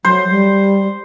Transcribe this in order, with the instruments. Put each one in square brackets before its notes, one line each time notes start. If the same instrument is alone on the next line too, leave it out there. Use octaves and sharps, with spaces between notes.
[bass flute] F#3 [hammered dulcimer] C5
[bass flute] G3